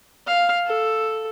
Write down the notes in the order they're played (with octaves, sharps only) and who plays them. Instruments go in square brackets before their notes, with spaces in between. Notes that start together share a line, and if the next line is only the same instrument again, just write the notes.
[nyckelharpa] F5
A4